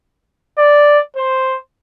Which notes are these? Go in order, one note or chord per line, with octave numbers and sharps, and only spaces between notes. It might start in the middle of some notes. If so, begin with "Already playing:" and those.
D5
C5